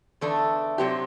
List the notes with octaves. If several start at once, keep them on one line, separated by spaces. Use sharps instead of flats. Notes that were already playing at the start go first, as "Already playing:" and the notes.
E2 D3 A3 D4
C3 F#3 C4 G4